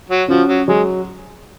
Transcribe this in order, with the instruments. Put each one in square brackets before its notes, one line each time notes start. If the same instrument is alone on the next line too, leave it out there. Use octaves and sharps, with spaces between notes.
[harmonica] F#3
[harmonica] F3 [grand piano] C#4 F#4
[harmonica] F#3
[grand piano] F#3 [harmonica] G#3